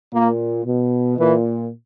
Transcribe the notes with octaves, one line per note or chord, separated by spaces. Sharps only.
A#2 A#3
B2
A#2 E3